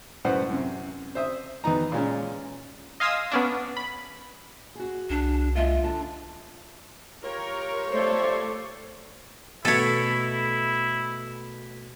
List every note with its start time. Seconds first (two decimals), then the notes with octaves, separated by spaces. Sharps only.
0.25 F#2 A2 B4 C5 F#5
0.49 F#2 C3
1.15 C5 E5 D#6
1.64 E2 B3 D#4 A#5
1.92 A#2 G#3 C#4
3.00 D#5 F5 G#5 C6 D#6 E6
3.31 B3 C#4 D4
3.77 B5
4.75 F#4 G#4
5.10 C2 D4
5.55 G#3 F4 E5 F5
5.83 D3 D4 A5
7.23 F4 G4 A#4 C#5
7.92 A3 A4 C5 D5
9.65 B2 A3 E4 A4 C#5